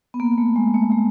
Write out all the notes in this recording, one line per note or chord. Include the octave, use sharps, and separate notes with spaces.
B3
A#3
A3
G#3
A3
G#3